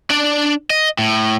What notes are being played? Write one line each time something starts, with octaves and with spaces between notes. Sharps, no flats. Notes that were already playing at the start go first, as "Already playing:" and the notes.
D4 D5
D#5
A2